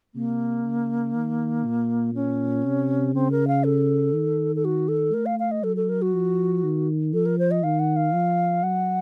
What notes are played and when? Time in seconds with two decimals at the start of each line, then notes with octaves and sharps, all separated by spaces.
0.15 C3 A#3
0.65 C#3
1.14 D#3
1.65 A#2
2.14 C#4
2.65 C3
3.14 C#3 C4
3.31 A#4
3.48 F5
3.64 A4
4.14 D#3
4.56 A4
4.65 F#4
4.88 A4
5.13 A3 A#4
5.26 F5
5.39 F5
5.51 D#5
5.64 F#3 A4
5.76 A4
5.89 A#4
6.02 F#4
6.14 F3
6.63 D#3
7.13 F3 A4
7.26 A#4
7.39 C5
7.51 D#5
7.63 D#3 F5
7.79 F#5
7.96 F5
8.13 F3
8.63 F#3 F#5